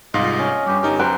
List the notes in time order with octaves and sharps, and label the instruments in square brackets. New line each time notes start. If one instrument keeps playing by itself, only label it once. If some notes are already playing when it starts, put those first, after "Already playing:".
[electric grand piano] C2 G#2 F5 [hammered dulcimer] F4 [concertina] D#5
[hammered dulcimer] C#4
[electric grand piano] G2 G3 [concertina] G4
[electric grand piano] G1 D#4 G4 [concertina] A#4
[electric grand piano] F#2 [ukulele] B4 G5 A#5 [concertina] C5